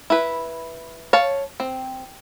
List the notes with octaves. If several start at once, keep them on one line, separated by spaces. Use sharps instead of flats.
E4 B4
C#5 F5 A5
C4